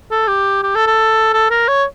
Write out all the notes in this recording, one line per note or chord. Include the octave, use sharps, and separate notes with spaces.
A4
G4
G4
A4
A4
A4
A#4
C#5